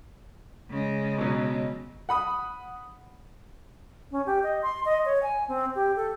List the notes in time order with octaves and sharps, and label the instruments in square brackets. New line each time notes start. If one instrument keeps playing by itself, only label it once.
[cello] C#3 G#3
[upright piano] B2 F#3
[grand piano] F#5 B5 D#6
[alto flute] C#4
G4
D#5
C6
D#5
C#5
G#5
C4
G4
A4